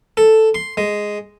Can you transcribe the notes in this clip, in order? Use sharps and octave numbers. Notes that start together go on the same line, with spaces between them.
A4
C6
G#3